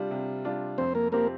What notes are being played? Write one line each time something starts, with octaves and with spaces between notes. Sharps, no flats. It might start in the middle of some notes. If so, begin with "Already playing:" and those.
Already playing: C3 G3 D4 F4
C3
G3 D4 F4
F2 C4 C5
A#3 A#4
F3 A#3 C4 G4 A#4